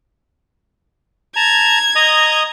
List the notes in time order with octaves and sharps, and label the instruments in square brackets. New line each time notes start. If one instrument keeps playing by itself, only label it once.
[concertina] A5 A#5 [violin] G#6
[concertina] D#5 A#5 D#6